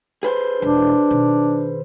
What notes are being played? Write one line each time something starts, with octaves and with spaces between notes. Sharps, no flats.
G#4 B4 C5
E1 D4
B2 D#3